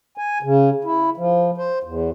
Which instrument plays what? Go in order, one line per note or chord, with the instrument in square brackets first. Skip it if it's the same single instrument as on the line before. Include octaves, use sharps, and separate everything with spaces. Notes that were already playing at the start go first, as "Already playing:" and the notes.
[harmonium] G#5
C#3
E4
F3
C5
E2